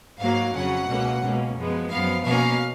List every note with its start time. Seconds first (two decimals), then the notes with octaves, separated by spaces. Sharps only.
0.19 G#2 F#3 A#3 F5
0.54 F2 C#3 F#3 C#4 F#5
0.87 C#2 B2 A#3 C#4
1.22 C#2 B2 A#3 C#4
1.56 F#2 F3 G#3 B3
1.90 F#2 F3 B3 F5
2.24 B2 A#3 C#4 F5